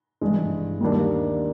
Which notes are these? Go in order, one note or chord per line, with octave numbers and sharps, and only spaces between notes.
G#1 G2 E3 G#3
D#2 D#3 G3 A#3 D4